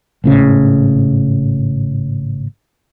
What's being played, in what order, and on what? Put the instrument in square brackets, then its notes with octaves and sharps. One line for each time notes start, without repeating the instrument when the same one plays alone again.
[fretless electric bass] G#1 A2 C#3